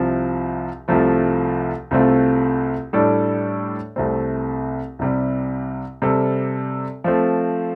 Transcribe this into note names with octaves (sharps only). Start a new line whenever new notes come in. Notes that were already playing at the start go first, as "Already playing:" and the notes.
Already playing: C2 C3 F3
C2 C3 F3 A3
C2 C3 A3 C4 F4
A2 G3 D4 A4 D5
C2 C3 A3 C4
C2 C3 G3
C3 G3 C4 A4 D5
F3 A3 C4